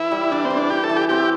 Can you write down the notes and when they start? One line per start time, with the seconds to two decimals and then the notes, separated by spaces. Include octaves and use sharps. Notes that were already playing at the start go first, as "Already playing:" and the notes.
Already playing: E3 E4
0.11 G3
0.32 E3 D4
0.45 C4
0.50 E3
0.57 D4
0.70 E3 G4
0.84 A4
0.89 E3
0.96 G4
1.09 C4 G4